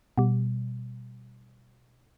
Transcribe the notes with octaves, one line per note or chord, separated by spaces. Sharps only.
B2 G3